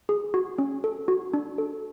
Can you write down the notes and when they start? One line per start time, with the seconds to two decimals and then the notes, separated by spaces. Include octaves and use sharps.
0.09 G#4
0.34 F#4
0.58 C#4
0.84 A4
1.08 F#4
1.34 D4
1.58 A4